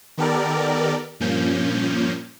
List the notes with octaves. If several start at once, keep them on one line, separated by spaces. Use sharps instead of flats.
D#3 B3 G4 A4 A#4 D5
G2 A#2 F3 A#3 C#4 G6